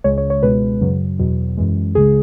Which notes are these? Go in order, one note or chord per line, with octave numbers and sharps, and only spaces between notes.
C#2 C#3 G#3 C#5
C#5
C#5
C#2 B2 G#3 B4
F#2 C#3 F#3
E2 B2 F#3
F#2 E3 G#3
C#2 C#3 G#3 G#4